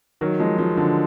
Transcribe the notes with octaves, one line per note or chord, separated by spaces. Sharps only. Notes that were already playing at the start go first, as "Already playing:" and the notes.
D#3 F#3
F3 G#3
F3 G#3
D3 F3